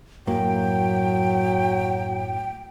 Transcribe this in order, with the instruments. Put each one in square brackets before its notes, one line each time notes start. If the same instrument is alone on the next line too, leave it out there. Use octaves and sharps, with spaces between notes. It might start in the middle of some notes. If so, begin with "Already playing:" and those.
[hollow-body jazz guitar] F#2 A2 A#3 [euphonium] F#3 [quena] G5